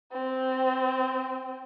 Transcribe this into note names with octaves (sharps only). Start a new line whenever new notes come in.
C4